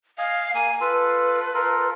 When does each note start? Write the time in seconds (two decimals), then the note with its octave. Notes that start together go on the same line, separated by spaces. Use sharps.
0.18 D#5 F5 G#5
0.54 A#3 G#5
0.81 F4 A4 B4
1.54 F4 A4 A#4